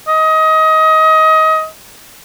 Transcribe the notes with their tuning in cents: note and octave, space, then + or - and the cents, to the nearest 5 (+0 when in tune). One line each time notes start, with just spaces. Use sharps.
D#5 +25